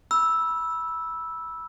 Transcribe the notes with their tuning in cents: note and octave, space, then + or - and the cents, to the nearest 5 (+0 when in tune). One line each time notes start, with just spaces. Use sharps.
B5 -20 E6 -5